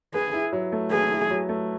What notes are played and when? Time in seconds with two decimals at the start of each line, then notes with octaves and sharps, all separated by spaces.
0.14 G#4 B4
0.34 E4
0.53 F#3
0.72 A3
0.92 G#4 B4
1.11 E4
1.31 F#3
1.49 A3